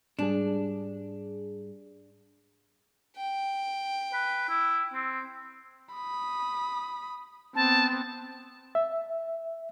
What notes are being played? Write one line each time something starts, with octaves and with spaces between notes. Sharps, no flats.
G#2 G3 D4 G#4
G5
B4
E4
C4
B5 D#6
B3 C4 A5
E5